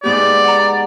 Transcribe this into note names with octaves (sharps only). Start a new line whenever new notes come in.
G#2 B3 G4 D5
F#5 A#5